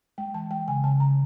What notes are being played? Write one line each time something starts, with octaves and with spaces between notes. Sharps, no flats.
G#3 G5
E3 A5
G#3 G5
C#3 G#5
C#3 A5
C#3 A#5